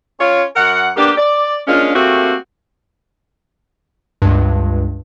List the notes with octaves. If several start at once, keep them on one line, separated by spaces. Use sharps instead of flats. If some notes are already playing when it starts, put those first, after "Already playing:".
C#4 F4 C#5
F#2 A#4 F#5
A#3 B3 D4 G4
D5
G#3 A#3 C#4 D4 F4
A3 A#3 C4 F#4 G4
C#2 G2